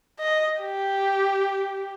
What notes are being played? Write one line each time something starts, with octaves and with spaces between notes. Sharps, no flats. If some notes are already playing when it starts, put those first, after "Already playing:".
D#5
G4